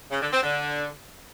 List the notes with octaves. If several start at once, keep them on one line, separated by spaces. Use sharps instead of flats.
C#3
D3
C4
D3